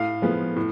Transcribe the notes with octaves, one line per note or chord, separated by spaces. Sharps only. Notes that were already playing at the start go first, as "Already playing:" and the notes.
Already playing: A2 F5
F3 G#3 B3
A2